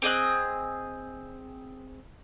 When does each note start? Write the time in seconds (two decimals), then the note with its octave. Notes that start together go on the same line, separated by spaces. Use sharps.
0.02 C4 G#4 D#5 F#6